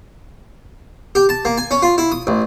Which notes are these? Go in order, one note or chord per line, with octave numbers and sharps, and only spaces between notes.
G4
A5
A#3
G#5
C#4
F4
E4
D#6
A1